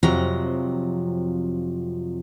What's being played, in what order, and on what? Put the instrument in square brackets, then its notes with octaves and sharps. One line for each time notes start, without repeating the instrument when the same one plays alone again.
[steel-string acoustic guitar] F2 C3 F3 F#3 A#5